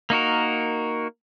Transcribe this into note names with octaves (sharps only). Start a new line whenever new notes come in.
A#3 D#4 F#4 A#4